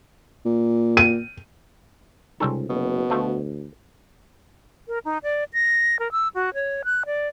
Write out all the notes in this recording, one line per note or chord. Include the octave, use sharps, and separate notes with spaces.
A#2
D#7
C#2 C3 G3 C4 C#4 D#4 A4
F#1 B2
D2 F3 A3
A#4
D#4
D5
A#6
A#4
E6
F#4
C#5
F#6
D5